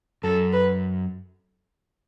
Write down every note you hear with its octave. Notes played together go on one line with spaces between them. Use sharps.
F#2 A4
B4